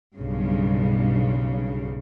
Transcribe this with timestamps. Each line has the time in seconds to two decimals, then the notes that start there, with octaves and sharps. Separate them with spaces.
0.16 B1 G2 C#3